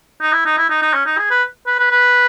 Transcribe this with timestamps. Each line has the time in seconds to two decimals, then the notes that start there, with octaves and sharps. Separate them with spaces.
0.21 D#4
0.32 E4
0.45 D#4
0.57 E4
0.70 D#4
0.82 D#4
0.94 C#4
1.06 D#4
1.18 G#4
1.30 B4
1.66 B4
1.79 B4
1.91 B4